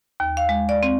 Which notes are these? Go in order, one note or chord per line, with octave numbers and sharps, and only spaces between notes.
D#2
F5
G#3
D5
C4